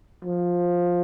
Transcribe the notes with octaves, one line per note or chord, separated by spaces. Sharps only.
F3